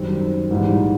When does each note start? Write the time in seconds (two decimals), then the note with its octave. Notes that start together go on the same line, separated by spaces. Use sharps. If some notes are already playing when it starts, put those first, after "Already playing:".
Already playing: F#2 D#3 G3 C4
0.50 A#1 G#2 E3 G3